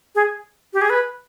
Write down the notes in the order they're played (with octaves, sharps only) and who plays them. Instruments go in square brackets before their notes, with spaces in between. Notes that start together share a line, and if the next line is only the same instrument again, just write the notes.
[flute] G#4
G4
G#4
B4